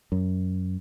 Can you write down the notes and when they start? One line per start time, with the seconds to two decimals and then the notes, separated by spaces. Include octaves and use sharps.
0.12 F#2